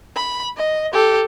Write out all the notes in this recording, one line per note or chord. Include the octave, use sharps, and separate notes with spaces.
B5
D#5
G4 A4